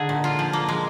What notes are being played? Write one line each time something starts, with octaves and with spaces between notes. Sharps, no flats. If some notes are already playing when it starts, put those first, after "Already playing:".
Already playing: D3 D#4 G#4
A#2
F4
F3
A#3
G#3